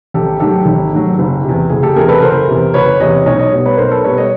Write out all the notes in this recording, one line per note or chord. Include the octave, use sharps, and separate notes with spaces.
G#1 G4 A4
G#2 D#3 F#3 G4 A4
G#1
G#2 D#3 F#3
F#1
E2 C3
F#1 G#4
G4 A4
E2 C3 G#4 A#4
A4 B4
F#1 A#4 C5
E2 C3
F#1 B4 C#5
E2 C3 C#5 D#5
B1 C#5 D#5
C#5 D#5
B2 G3
B4 C#5
B1 A#4 C5
A4 B4
B2 G3 B4 C#5
C#5 D#5